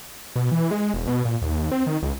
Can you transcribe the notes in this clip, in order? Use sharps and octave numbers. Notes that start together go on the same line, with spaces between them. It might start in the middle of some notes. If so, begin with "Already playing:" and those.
B2
E3
G#3
E1
B2
A#2
D#2
C4
D#3
C#2